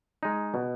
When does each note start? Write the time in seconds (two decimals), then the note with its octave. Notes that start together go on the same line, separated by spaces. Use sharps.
0.23 G#3 D#4
0.54 B2